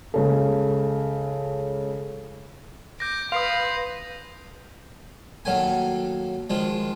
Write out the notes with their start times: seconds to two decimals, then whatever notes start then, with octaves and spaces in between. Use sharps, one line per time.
0.14 C#2 C#3 A4
3.00 D6 G6 A#6
3.32 B4 F5 C6 D#6 C7 F7
5.45 D#2 F#3 A3 G#5
6.50 D#3 F3 G#3